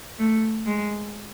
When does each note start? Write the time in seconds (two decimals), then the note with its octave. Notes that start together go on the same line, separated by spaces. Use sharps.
0.19 A3
0.67 G#3